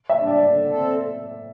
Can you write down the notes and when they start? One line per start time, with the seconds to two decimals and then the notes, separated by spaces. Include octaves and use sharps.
0.09 E5
0.18 G3 D4
0.27 D5
0.44 D3 D5
0.69 C4 A4